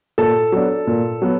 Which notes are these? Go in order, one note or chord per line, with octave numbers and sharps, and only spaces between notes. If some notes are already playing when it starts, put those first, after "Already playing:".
A#2 A4 A5
F#3 B3 D4
A#2
F#3 B3